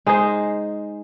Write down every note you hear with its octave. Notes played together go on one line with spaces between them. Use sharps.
G#3 D#4 G#4 C5